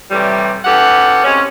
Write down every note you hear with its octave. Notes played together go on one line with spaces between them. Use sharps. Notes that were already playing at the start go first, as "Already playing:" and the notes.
A2 C3 E3 G3
E3 C#4 G4 A4 F#5
C3 G#3 C#4